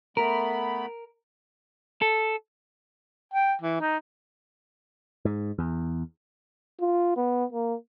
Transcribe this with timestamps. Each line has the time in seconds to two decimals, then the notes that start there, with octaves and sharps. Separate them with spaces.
0.17 A3 B3 A#4 B5
2.02 A4
3.34 G5
3.61 E3
3.80 D#4
5.25 G#2
5.59 E2
6.80 F4
7.16 B3
7.53 A#3